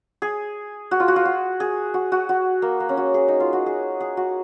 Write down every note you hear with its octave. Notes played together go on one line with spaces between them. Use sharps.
G#4
F#4
F4
F#4
F4
F#4
G#4
F#4
F#4
F#4
A#3
A#3
C#4
F#4
G#4
D#4
F4
F#4
G#4
G#4
F#4